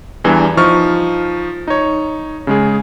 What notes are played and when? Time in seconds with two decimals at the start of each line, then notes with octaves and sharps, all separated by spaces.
0.24 E2 E3 G3 D4
0.57 F3 D#4 C#6 F6
1.67 D#4 C#5
2.47 C#3 G#3 G#4